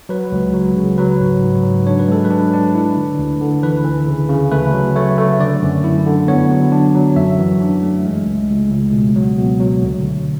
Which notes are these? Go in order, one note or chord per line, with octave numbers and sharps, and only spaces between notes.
F#3 B4
C#2
F#3
C#3
F#3 B4
G#2
G#2
F#3
D4 C#5
B4
G#3 A4
B4
D4
D4
E4
D3
D2
D3
E3 B4
E3
C#3
C#3
A3 B4
F#3
A3 C#5
A3
D3 D5
F#2
E4
D3
B3 C#5
F#3
D4
F#3
F#2 E5
E3
D4
A3
G#3
C#2
C#2
C#2
B2
F#3
B2
F#3
D2
D2